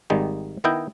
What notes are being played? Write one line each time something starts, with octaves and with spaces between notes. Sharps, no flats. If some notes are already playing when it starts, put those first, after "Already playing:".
G#1 D#3 G3 G#3 D#4
D#3 B3 E4 D#5 G5